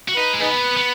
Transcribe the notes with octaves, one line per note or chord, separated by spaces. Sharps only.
F#4
D#4 B4
G#3
B3 D#4 G#4 B4
B3